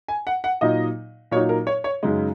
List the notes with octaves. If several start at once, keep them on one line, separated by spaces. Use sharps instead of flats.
G#5
F#5
F#5
A#2 F#3 D#4 D#5
A#2 F#3 D#4 C#5
A#4
C#5
C#5
F#2 C#3 G#3 D#4